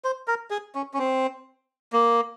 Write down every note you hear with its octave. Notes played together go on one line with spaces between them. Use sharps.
C5
A#4
G#4
C#4
C#4
C4
A#3